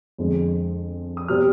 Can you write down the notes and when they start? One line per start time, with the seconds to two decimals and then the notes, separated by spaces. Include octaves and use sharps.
0.18 F2 D3 G#3
1.17 D#6
1.28 C3 G3 C4 F6